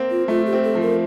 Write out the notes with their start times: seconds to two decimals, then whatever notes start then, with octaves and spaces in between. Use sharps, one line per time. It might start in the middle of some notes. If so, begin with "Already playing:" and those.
Already playing: A#3 C4
0.11 F4
0.28 A3 F4
0.46 G4
0.53 C4
0.64 A4
0.75 F3
0.81 A#4